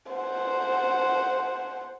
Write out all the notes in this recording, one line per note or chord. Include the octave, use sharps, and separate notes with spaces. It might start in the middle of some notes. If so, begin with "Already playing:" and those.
C5 F#5